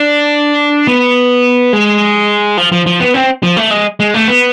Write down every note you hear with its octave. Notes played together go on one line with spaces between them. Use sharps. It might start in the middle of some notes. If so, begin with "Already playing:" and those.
Already playing: D4
B3
G#3
F3
F3
F3
B3
C4
F3
A3
G#3
G#3
A3
B3